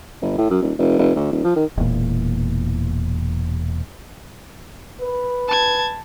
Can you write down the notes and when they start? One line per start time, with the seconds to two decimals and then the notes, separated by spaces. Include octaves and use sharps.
0.22 G1
0.38 A2
0.50 F#2
0.62 D#1
0.79 F1
0.99 F1
1.15 D2
1.32 D#1
1.44 F3
1.56 D#3
1.77 E1 E2 A#2
5.01 B4
5.48 A5 G#6